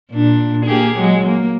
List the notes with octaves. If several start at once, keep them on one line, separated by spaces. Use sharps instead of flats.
A#2 D4
A#3 G4 G#4
F#3 G#3
A#3